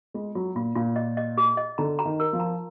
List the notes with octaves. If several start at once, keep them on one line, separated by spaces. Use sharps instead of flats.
G#3 F4
F#3 F4
A#2 F4
A#2 F4
D#5
D#5
G#4
D#5
D3 A#5
A#5
D#3
A#4
F3
A#5